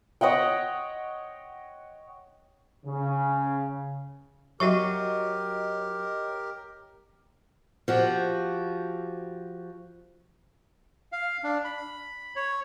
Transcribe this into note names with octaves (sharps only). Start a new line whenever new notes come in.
C#5 D#5 F#5 G5
C#3
F#3 F#4 G4 A#4 C#5 D#5 E5 C#6
F3 F#4 G4
F5
D4
B5
C#5